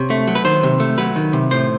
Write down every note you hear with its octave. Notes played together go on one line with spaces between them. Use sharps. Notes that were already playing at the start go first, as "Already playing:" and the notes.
Already playing: C3 C#5
A3
F#3
B4
D#3 C5
C3
A3
F#3 B4
D#3
C3
A2 C5